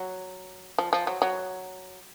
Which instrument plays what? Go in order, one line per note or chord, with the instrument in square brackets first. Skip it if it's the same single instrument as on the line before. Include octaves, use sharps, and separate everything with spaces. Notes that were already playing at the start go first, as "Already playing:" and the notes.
Already playing: [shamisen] F#3
F3
F3
F#3
F#3